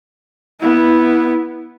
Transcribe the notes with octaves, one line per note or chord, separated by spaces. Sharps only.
B3 E4